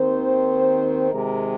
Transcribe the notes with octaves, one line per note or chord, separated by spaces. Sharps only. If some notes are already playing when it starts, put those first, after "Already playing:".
Already playing: D#2 D#3 C4 C5
C3 D#3 G#3 A#4